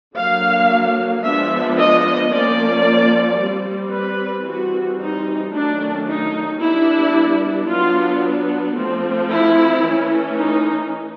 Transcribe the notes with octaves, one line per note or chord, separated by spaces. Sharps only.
D3 F#3 A#3 F5
F3 G#3 B3 D4 E5
D#5
F3 A#3 C#4 D5
G3 C4
B4
E3 G3 C4 F#4
D#4
D#3 F#3 A3 C#4 D4
D#4
G3 B3 D4 E4
F#3 B3 D4 F4
F3 A3 C4
E4
E3 A3 C#4
D#4